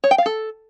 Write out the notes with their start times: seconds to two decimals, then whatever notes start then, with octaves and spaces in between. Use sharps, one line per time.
0.04 C#5
0.11 G5
0.18 F5
0.26 A4